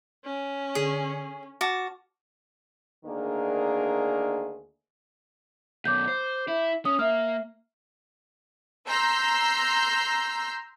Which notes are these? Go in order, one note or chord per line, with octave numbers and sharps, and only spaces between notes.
C#4
D3 G#4
C#5
F#4 A5 D6 F6
D2 D#3 A#3 D4 G#4 A#4
F#2 B2 D6 G6
C5
E4
C#4 D#6
A#3 E5 F6
A#5 C6 E6 G6